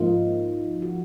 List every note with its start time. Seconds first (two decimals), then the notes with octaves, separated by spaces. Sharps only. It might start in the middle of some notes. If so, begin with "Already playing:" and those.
Already playing: G#2 F3 A#3 D#4 F4
0.82 F#4